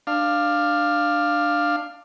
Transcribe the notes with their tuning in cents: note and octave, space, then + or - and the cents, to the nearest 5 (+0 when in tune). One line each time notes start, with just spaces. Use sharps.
D4 +15 F5 +0